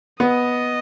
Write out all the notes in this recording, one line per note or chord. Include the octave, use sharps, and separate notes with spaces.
B3 D#5